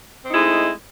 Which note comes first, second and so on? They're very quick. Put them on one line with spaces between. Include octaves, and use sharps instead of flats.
C4 D#4 E4 G#3 A3